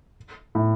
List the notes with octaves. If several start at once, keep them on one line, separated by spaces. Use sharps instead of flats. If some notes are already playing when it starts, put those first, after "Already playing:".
A2